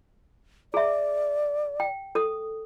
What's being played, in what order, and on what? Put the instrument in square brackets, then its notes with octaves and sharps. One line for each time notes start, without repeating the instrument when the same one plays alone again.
[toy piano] G#4 E5 [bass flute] D5
[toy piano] G5
A4 D#6